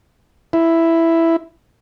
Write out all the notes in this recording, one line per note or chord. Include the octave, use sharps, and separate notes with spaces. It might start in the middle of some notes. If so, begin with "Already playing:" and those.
E4